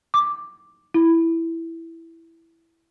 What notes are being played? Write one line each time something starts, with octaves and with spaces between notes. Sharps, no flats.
D6
E4